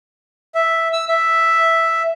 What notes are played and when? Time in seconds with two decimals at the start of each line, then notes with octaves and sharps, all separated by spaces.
0.55 E5
0.93 E6
1.08 E5